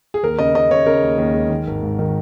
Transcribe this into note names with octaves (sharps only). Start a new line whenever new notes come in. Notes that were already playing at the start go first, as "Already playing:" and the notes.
G#4
D#2 A#4
C#3 D#5
C#3 D#5
C#3 C#5
C#3 A#4
D#2
D#2
G#3
D#3
G#1
G#2
D#3